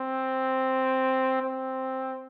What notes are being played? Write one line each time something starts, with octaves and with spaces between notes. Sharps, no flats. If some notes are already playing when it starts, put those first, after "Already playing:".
Already playing: C4
C4